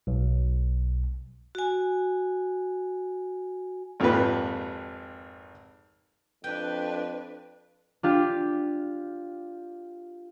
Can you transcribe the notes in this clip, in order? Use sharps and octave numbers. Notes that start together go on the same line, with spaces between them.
B1
F#4 G#5
G#1 F2 A#2 G4 B4
F2 D4 B4 G5
D4 F4 G4